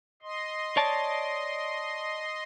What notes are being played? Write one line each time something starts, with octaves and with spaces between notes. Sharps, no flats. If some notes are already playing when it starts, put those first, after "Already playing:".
D#5 C6
C#5 D5 A5